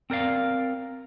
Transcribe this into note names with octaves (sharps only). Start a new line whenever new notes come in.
C4 A#4 D5 F5